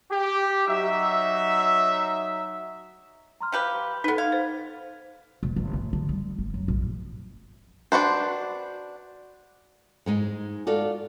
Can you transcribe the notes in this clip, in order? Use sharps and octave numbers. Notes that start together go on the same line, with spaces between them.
G4
F#3 D#4 E5
A#5 C6 F6
F3 G4 B4
B3 D#4 A4 B4
F5 G#6
C5
E1
G1
A3
D3
G3
G1
F#2
A#1
D4 F#4 B4 C5
G#2 G#3 D#4
F4 F#4 A4 D5